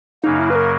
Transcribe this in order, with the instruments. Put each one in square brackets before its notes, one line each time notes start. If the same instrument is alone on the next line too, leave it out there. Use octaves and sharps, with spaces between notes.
[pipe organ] F#2 C#3 F#3 A#3 [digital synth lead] D#4
[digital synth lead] E4
B4
A#4